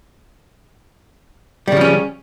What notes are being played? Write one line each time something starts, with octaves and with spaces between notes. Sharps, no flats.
C#3 F3 G3 C#4